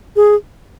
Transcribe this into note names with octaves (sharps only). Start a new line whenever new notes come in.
G#4